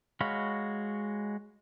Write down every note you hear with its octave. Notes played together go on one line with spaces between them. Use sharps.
G#3 F#4 C#5 F5 B5